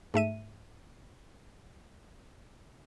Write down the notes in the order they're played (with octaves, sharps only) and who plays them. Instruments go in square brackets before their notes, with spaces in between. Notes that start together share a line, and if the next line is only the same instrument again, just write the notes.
[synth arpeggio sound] G#2 A3 E5 D#7